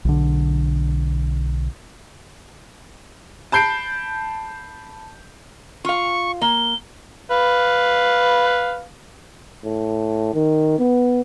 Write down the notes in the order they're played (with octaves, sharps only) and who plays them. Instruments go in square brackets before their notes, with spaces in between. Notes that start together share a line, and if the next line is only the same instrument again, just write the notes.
[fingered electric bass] B1 D3
[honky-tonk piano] A5 B5 G6 C7 D7
[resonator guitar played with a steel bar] F4 F5 [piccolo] C#6
[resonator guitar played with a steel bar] A#3 [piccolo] G7
[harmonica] B4 F5
[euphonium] A2
D#3
B3